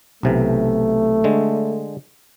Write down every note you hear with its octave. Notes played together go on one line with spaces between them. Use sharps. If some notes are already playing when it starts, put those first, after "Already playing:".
B1 C3 E3 A3
D3 G#3